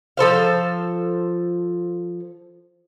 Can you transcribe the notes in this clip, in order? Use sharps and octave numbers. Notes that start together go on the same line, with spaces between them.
F3 A4 C5 F5